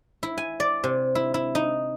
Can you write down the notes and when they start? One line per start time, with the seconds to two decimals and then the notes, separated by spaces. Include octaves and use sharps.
0.23 E4
0.38 G#5
0.60 D5
0.84 C3
1.15 E4
1.34 E4
1.55 D#4